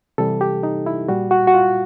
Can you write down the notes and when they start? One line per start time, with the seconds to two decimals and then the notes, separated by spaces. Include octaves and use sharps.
0.18 C3 E3 G3 A4
0.41 G4
0.63 D#4
0.86 E4
1.08 A#2 G3 F#4
1.31 F#4
1.47 F#4
1.54 F4